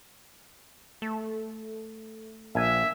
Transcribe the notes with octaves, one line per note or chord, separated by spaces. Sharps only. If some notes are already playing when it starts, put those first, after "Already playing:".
A3
A#1 E5 G#5